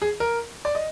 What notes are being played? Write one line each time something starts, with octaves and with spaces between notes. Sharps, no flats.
G#4
A#4
D5
D#5